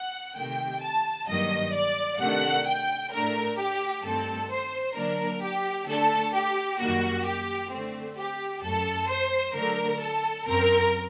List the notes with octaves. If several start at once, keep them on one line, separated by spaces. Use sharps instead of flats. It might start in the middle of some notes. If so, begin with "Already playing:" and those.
Already playing: F#5
C3 D#3 A3 G5
A5
G2 D#3 F#3 A#3 D#5
D5
C3 D#3 A3 D4 F#5
G5
A2 A3 D4 A#4
G4
G2 D#3 A3 C4 A4
C5
D3 F#3 A#3 D4 A#4
G4
D3 A3 D4 A4
G4
F#2 D#3 G3 A#3 F#4
G4
D3 A3 C4
G4
F#2 F#3 A3 A4
C5
D3 F#3 A3 D4 A#4
A4
F#2 F#3 C4 A#4